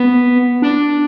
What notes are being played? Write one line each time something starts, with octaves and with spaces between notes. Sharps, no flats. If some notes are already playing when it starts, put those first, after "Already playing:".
Already playing: B3
D4